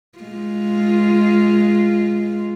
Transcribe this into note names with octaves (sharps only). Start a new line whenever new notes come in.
G#3 F4